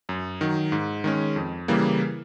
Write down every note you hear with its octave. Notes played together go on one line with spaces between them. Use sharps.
F#2
D#3 F#3
G#2
D#3 G#3 C#4
F2
C#3 E3 G3 A#3